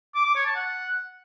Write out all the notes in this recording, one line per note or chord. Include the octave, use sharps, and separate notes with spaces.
D6
D6
C#5
A5
F#5